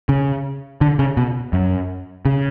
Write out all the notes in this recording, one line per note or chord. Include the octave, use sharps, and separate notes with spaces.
C#3
D3
C#3
B2
F#2
C#3